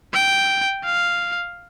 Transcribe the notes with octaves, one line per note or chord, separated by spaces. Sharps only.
G5
F5